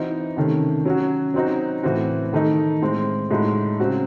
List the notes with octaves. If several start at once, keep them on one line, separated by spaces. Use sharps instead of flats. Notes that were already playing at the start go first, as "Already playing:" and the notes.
Already playing: E3 C4 D#4 F#4
C3 D#3 A3 C#4
F#3 C#4 F#4
F#3 C4 D#4 F#4
A2 E3 C4 F#4
D#3 A3 D#4
A2 G#3 C4
A2 G#3 D#4 F#4
C#3 F#3 C4 F#4